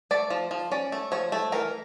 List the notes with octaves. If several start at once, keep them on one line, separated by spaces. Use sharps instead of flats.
A3 D5
F3
F3
C#4 D5
A3
F3 C#5
A3
E3 A#4